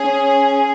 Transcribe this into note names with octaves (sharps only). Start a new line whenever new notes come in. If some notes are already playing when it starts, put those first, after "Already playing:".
Already playing: C#4 G#4